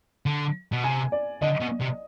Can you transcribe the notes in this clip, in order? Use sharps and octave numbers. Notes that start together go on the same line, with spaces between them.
D3
B2
C3 G#5
D5
D3 D#5
B2
C3